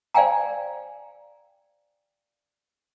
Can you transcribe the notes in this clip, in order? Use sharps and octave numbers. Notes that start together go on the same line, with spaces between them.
C5 D5 F5 G5 G#5 A#5